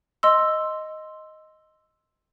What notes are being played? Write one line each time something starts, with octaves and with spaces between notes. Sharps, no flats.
D#5 C6 E6